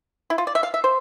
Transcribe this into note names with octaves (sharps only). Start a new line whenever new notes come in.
E4
F4
D5
E5
F5
E5
C5